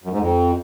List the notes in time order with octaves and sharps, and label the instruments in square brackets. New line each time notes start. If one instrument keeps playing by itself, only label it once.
[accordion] F#2
G#2
F2